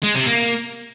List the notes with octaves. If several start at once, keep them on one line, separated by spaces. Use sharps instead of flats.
G#3
C3
A#3